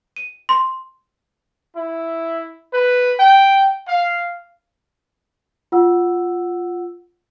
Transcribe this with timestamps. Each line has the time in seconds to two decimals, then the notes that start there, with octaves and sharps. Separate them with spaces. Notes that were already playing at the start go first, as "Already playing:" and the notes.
0.16 D#7
0.49 C6
1.76 E4
2.73 B4
3.19 G5
3.88 F5
5.72 F4 F#5 E6